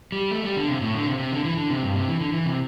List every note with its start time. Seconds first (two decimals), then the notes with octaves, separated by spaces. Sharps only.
0.12 G3
0.31 A3
0.44 G3
0.56 D3
0.68 C3
0.81 A2
0.95 D3
1.07 C3
1.19 C3
1.32 D3
1.45 E3
1.57 D3
1.70 C3
1.83 G2
1.95 C3
2.08 E3
2.21 D3
2.33 E3
2.46 C3